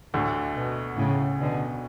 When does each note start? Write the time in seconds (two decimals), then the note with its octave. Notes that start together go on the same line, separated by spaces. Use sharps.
0.13 D2 A2 D3 A3
0.56 B2
0.97 A2 C#3
1.39 B2 D3